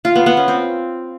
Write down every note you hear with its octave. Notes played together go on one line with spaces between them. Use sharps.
F4
B3
B3
C#4
C4